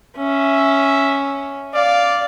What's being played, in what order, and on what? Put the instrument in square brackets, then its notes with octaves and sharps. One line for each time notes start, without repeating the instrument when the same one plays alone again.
[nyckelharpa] C#4 [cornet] E5
[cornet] D5 [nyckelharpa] F5